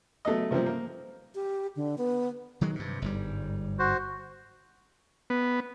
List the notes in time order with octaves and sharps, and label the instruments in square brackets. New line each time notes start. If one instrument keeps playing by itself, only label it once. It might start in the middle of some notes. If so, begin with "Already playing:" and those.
[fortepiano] F#3 A3 B3 D#5
C3 F3 G3 A#3 C4
A#3
[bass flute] G4
D3
B3
[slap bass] D#3 F#3 G#3
G2 C3
G1 G#2 G3
[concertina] F#4 C5
[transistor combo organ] B3